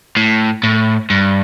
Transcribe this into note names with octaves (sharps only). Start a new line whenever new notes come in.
A2
A2
G2